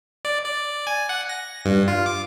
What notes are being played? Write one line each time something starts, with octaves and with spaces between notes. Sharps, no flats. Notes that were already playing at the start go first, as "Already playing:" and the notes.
D5
D5
G#5
F#5
A#6
G2
F4
D6